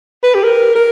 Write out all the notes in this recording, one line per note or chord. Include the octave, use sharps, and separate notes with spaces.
B4
G4
A#4
A#4